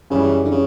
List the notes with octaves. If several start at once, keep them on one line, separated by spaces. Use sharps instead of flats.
F#2 C#3 E3 G3
D3
C#3